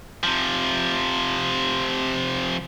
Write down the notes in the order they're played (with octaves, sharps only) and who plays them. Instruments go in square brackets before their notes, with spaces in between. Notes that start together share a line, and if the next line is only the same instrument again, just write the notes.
[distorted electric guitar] C3 F3